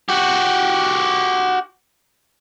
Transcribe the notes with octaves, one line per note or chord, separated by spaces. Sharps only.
F#4 G4